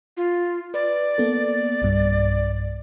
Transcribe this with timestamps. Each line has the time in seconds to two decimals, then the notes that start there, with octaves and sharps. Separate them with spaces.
0.17 F4
0.74 B4 D5
1.18 A#3 B3 A4
1.82 B1 G2